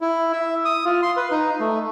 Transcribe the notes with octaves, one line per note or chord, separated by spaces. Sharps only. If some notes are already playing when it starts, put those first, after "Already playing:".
E4
E5
D#6
F4
C6
B4
D#4
A3